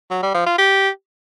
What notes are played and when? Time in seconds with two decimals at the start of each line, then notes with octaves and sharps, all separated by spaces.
0.10 F#3
0.22 G3
0.34 F3
0.46 F4
0.58 G4